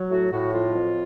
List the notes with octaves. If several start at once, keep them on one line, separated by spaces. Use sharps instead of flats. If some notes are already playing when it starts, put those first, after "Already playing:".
Already playing: F#3
A2 F#4
A2 F#4
F2 F4
F2